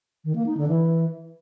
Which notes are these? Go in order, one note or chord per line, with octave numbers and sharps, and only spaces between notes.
D#3
A#3
D#4
D3
E3